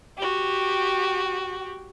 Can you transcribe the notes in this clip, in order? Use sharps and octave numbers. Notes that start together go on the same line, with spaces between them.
F#4 G4